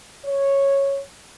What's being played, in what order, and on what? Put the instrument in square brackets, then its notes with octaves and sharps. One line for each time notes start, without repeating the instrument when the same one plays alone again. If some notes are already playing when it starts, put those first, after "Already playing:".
[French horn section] C#5